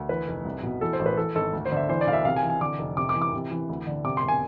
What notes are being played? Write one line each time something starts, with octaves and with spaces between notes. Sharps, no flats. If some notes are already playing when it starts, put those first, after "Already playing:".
Already playing: D2
E3 B4
F1
C2
B2
E3 A4
C5
A1
B4
E3 A4
G#1 A4
D2
C5
D3 E5
E3 C5
D5
B1 F5
E5
C3 F5
G#5
E3
G#5
D3 D6
F1
C3 D6
D6
E3
D6
C3
E3
D2
D3
C3 D6
C6
E1
G#5